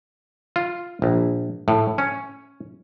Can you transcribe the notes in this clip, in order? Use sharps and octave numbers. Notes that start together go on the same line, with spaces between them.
F4
A#1
A2
C#4